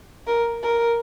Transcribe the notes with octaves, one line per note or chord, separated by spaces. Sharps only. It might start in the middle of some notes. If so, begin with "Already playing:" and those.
A#4
A#4